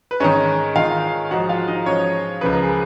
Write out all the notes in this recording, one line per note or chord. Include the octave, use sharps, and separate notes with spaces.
B4
G#2 D#3 C#4 C#5
G#2 D#3 F4 F5
G#2 F3 F#4 F#5
F4 F5
D#4 D#5
G#2 F3 C#4 C#5
C#2 C#3 F3 B4
A#4
G#4